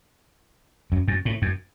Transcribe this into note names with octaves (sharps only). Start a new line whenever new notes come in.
F#2
F#2
A2
F#2